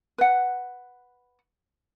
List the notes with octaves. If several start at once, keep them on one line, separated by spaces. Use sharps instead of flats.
B4 F#5